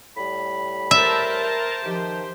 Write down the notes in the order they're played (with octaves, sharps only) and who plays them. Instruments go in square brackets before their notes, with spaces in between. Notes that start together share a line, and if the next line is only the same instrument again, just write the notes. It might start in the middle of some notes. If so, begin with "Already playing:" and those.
[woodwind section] A2 G3 B5
[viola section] A#4 C5 A5 [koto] E5
[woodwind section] D#3 F3 [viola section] G4 C5